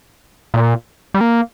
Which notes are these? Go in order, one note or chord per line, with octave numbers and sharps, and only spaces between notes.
A#2
G3
A#3